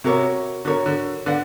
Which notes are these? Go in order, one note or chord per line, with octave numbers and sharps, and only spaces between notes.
C3 F#4 A#4 C#5
D3 F#4 A#4 C#5
D3
D3 B4 D5 F#5